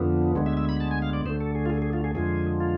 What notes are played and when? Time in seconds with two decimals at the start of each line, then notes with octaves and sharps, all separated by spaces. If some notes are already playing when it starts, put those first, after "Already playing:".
Already playing: F2 D3 F3 B3
0.35 D2 D3 G#3 B3
0.46 E5
0.57 E5
0.69 B5
0.80 A5
0.91 G#5
1.02 F5
1.13 D5
1.26 D2 D3 A3 C5
1.41 A4
1.55 G#4
1.66 F4
1.70 G#4
1.82 G#4
1.93 F4
2.04 G#4
2.15 F2 D3 F3 G#3 G#4
2.60 F4